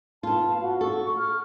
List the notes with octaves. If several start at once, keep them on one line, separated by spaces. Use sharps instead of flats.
B3 F4 A5
F5
F#4
A4 C#6
F6